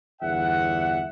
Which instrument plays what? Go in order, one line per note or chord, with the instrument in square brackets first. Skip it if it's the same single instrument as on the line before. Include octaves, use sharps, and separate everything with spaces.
[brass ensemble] G1 E2 E5 F#5